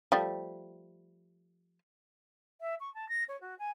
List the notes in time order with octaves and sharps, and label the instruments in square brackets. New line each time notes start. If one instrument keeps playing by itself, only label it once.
[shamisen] F3 G3 A3
[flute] E5
C#6
A5
A#6
C#5
F#4
G#5